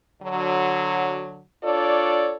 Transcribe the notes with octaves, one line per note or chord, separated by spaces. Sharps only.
D3 F#3
D4 F4 A4 C#5 D5